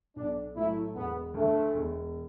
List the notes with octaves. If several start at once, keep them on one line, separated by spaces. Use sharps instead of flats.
B1 D4
A2 F#3 A3 E4
E1 B3
D2 D3 A3
E1